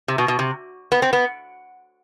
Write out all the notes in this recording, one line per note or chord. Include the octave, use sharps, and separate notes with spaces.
C3
B2
B2
C3
B3
C4
B3